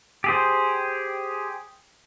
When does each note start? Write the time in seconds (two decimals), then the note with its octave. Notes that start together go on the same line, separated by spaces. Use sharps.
0.24 G4 G#4 C5